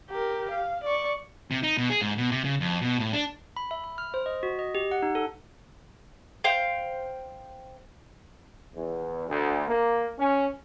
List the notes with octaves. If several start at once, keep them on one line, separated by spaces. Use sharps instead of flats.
G4 A#4
F5
D5 C#6
C3
D#4
B2
G#4
G#2
B2
C3
C#3
F2
B2
A2
D4
B5
E5
B5
F6
C5
D#5
F#4
D#5
G4
F#5
D#4
A4
C5 F5 G5
E2
D2
A#3
C#4